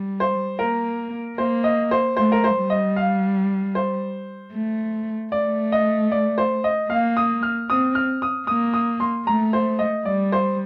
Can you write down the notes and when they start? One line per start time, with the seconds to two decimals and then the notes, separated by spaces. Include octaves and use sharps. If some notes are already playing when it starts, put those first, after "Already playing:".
Already playing: G3
0.20 C5
0.59 A#3 A#4
1.38 A#3 C5
1.64 D#5
1.91 C5
2.17 A3 C5
2.32 A#4
2.44 C5
2.56 G3
2.70 D#5
2.96 F5
3.75 C5
4.54 A3
5.32 A3 D5
5.72 D#5
6.12 D5
6.38 C5
6.64 D#5
6.90 A#3 F5
7.17 D#6
7.43 F6
7.69 C4 D#6
7.95 F6
8.22 D#6
8.47 A#3 D#6
8.74 D#6
9.00 C6
9.27 A3 A#5
9.53 C5
9.79 D#5
10.05 G3 D5
10.32 C5